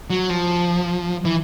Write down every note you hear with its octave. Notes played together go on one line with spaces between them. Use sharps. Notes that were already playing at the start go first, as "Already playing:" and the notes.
F#3
F3
E3